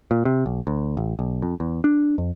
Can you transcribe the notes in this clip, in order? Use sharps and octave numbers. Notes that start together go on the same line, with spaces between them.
A#2
C3
B1
D2
A1
B1
F2
E2
D4
F2